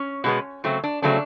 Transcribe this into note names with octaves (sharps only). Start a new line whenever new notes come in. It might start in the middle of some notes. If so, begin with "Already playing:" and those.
Already playing: C#4
B2 G#3 B3
C#3 F#3 A3 C4
D4
C#3 F#3 A3 C4 D4